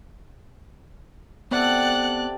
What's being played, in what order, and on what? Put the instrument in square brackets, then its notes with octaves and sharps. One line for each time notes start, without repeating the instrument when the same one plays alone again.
[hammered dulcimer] C3 A4 [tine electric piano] B3 [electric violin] D5 F#6 [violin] F#5